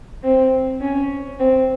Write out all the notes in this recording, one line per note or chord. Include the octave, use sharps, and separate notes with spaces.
C4
C#4
C4